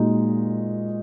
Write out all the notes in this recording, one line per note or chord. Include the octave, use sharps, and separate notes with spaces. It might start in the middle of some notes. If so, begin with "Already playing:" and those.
Already playing: A#2 G#3 D#4 F#4